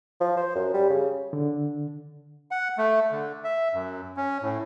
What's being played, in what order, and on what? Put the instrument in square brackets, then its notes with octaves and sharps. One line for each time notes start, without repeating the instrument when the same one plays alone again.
[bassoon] F3
C5
F#2
G3
C#3
[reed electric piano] D3
[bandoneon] F#5
A3
D3
E5
F#2
C#4
A2